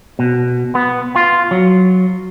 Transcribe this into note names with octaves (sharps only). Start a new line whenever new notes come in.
B2
B3
F4
F#3